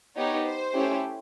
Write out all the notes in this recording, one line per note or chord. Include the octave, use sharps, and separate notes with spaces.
B3 D#4 G4 C#5
C5
A3 C#4 E4 G4